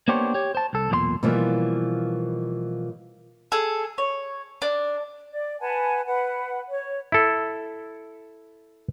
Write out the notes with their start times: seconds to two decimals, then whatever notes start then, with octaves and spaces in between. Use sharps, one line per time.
0.08 A#3 B3 D4 G4 C5 C#5
0.34 G4 C#5
0.55 C5 A5
0.73 C2 A4
0.90 B1 E2 A#2 D5 C6
1.23 B2 E3 F3 G3 A#3
3.52 G#4 A4
3.98 C#5
4.62 D4
5.32 D5
5.60 B4 F#5 G#5 A5
6.06 B4 F#5
6.70 C#5
7.12 E4 A4